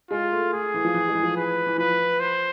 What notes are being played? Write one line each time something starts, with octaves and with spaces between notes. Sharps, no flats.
G#3 F4
A3
A3 G#4
E3
F3
E3
G#3
E3
F3
B4
E3
F3 B4
C5